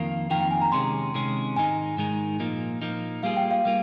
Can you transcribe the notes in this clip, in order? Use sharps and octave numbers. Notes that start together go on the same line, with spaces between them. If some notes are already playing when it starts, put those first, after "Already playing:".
Already playing: F2 D#3 A#3 F4 A#4 F5
F2 D#3 A#3 F4 A#4 G5
G5
G#5
A#5
C3 D#3 G#3 C#4 G#4 C6
C3 D#3 G#3 C#4 G#4
G#2 D#3 G#3 D#4 G#5
G#2 D#3 G#3 D#4
A#2 F3 A#3 D#4
A#2 F3 A#3 D#4
G3 A#3 F4 G#4 F5
G5
F5
G3 A#3 F4